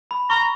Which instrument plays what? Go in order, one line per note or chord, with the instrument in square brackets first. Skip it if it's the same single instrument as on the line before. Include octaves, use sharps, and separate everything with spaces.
[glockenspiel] B5
[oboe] A#5 [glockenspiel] C#6